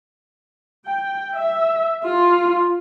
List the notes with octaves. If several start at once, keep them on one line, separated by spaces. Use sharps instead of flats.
G5
E5
F4